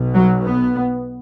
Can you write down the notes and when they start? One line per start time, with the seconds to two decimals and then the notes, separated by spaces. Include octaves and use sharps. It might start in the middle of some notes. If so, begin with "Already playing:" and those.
Already playing: B1 B2
0.15 F#3
0.43 B3